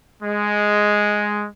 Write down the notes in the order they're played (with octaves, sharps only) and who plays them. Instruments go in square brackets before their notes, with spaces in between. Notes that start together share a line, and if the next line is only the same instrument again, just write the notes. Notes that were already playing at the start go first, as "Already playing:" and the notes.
[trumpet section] G#3